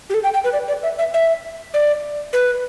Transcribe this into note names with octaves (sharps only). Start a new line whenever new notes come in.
G4
A4
G5
G5
B4
D5
D5
E5
E5
E5
D5
B4